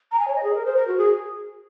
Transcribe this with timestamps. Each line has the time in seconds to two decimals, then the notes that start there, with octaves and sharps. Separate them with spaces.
0.12 A#5
0.19 G#5
0.27 C#5
0.35 D#5
0.43 G#4
0.55 A#4
0.65 C5
0.76 A#4
0.87 F#4
0.97 G#4